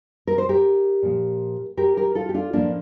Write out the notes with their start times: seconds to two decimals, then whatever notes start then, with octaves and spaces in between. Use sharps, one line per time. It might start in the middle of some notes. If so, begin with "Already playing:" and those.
0.27 A#4
0.38 C5
0.49 G4 A#4
1.03 A#2 F3
1.77 G4 A#4
1.97 G4 A#4
2.15 F4 A4
2.29 G4
2.34 D4 F4
2.53 A2 F3 A#3 D4